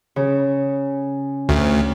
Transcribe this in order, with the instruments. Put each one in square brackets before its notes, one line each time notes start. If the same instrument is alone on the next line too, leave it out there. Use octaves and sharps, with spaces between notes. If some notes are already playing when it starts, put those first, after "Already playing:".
[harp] C#3
[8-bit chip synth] D2